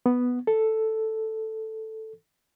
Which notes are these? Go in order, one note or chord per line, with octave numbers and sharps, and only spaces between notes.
B3
A4